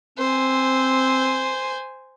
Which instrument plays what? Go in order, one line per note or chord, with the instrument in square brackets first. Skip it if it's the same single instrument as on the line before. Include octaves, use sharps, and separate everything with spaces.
[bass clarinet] C4 [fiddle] C5 G#5